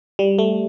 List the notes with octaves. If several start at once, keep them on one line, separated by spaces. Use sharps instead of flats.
G3
A3